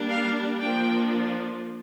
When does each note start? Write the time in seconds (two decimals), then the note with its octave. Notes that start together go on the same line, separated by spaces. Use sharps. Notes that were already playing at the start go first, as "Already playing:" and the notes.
Already playing: G3 A#3 D4
0.10 F5
0.60 F3 A#3 D4 G5